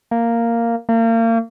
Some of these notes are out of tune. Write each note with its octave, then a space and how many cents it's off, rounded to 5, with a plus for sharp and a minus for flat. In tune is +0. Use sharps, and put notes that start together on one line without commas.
A#3 -5
A#3 -35